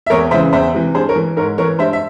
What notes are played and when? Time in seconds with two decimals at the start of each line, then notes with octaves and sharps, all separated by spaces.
0.06 E5
0.10 E2 A#4 C#5
0.31 C#3 E3 C5 E5
0.53 E2 C5 E5
0.74 C3 E3
0.94 G2 G#4 C5
1.09 A#4 C#5
1.16 E3
1.36 G#2 A#4 C#5
1.58 E3 A#4 C#5
1.79 G2 C5 E5
1.93 E5